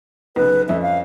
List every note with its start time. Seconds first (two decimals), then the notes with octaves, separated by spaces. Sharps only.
0.36 B1 C#3 B4
0.68 F2 C#4 E5
0.82 F5